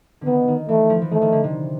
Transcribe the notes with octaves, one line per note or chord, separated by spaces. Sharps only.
D3 D#3 B3
D#3
E3 A3
F3
E3
D#3 A3
D#3
D3
C3